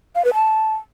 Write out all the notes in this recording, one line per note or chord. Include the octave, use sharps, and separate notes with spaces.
F5
B4
A5